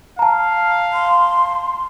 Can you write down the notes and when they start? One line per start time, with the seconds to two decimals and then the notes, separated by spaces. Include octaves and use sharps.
0.19 F5 A5 A#5
0.93 C6